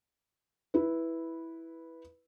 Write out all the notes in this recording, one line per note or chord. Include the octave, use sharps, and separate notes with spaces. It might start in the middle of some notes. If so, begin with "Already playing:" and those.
E4 B4